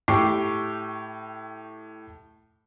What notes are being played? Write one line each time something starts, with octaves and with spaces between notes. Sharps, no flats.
A2 G4 G5 C#6 D6 C7